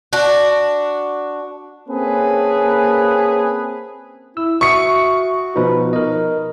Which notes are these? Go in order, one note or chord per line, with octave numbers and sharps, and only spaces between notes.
D4 F#4
A#3 C4 C#4 G#4 A4 B4
E4 E6
F#4 E5 C#6 D#6 C#7
B2 F3 D#4 B4
D#4 A#4 D#5